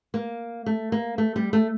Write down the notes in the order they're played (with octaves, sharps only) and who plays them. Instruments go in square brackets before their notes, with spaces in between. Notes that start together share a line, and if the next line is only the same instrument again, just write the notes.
[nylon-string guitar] A#3
A3
A#3
A3
G3
A3